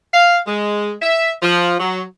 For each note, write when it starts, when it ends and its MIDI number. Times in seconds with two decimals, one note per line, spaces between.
0.13 0.37 77
0.46 0.92 56
1.02 1.30 76
1.42 1.74 53
1.79 2.02 54